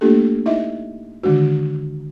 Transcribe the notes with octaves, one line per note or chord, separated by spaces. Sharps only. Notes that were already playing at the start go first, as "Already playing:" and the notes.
A3 A#3 D4 F4 G4 A4
D#4 E4 D#5 E5
D3 D#3 G#3 D4 F#4